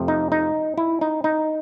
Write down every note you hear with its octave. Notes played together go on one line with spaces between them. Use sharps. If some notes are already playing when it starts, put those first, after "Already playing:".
Already playing: F2 C3 F3 A3
D#4
D#4
E4
D#4
D#4